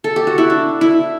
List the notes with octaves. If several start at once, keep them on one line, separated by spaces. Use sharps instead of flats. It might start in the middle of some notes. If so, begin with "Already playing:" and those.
A4
G4
F#4
E4
D4
E4